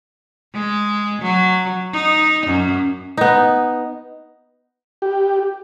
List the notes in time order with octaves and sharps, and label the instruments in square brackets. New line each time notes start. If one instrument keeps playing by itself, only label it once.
[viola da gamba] G#3
F#3
D#4
F#2
[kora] B3 D#4
[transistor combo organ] G4